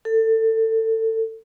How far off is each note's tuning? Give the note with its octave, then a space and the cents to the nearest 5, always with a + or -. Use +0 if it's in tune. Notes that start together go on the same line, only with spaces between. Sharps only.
A4 +25